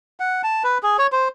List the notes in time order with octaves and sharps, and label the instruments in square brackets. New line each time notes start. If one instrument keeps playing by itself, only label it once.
[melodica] F#5
A5
B4
G#4
C#5
C5